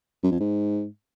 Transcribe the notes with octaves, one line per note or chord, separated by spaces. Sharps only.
F#2
F2
G#2